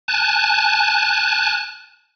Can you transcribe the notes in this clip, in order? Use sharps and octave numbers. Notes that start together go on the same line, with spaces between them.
G#5 A5 F#6